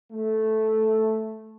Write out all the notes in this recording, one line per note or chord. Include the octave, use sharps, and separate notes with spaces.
A3